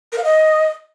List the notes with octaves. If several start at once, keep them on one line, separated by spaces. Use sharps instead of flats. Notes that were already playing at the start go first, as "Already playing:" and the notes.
A#4
F5
D#5